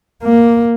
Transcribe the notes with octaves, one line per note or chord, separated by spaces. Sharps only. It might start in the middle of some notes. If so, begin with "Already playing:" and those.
A#3